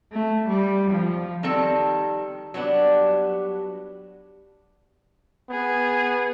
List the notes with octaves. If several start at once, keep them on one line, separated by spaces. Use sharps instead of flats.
A3
G3
F3
D#3 G3 C4 A4 A5
F#3 G3 B3 D4
B3 G#4